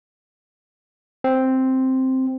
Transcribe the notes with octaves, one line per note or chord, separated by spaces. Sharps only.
C4